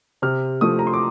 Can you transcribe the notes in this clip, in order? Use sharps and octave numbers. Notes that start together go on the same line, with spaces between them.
C3 F6
F3 A3 D#6
A#5
C6
D6